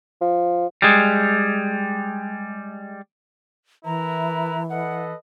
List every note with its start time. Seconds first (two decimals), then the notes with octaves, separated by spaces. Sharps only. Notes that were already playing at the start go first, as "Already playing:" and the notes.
0.21 F3
0.82 G3 G#3
3.85 E3 E4 A#4 B4 A#5
4.70 A4 B4 D#5 F#5